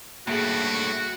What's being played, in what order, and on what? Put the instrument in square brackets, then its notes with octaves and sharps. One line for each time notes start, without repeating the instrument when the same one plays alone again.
[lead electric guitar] G2 A3 [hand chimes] A#3 G#4 [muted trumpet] F#4